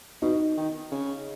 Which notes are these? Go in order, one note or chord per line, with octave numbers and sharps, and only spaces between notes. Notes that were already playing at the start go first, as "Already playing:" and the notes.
B2 D#4
D#3
C#3